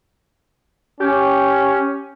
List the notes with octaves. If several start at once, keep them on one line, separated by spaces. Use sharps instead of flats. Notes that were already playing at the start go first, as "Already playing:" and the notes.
C#4 G4